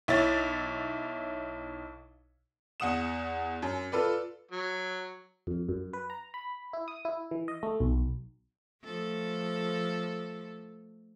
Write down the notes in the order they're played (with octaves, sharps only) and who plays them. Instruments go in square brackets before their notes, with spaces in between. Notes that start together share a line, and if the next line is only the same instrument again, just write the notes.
[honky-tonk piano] B1 E4 C#5 A6
E2 F#5 D#6 E7
F#2
F4 A4 B4 D5
[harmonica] F#3
[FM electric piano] F2
F#2
B4
A#5
B5
E4
D#6
E4
E3
D#5
A3
B1
[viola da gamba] F3 A3 A4